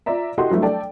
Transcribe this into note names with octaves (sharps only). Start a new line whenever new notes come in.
F4 D5 E5 A#5
E4 F#4 G4 A4 D#5 C6
E3 F#3 G3 A3 D4
A4 D5 G5 A5